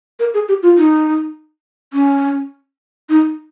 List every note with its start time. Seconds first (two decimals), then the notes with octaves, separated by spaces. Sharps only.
0.20 A#4
0.34 G#4
0.49 G4
0.63 F4
0.78 D#4
1.93 C#4
3.09 D#4